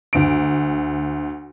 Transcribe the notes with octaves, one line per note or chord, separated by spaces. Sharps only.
D2 D7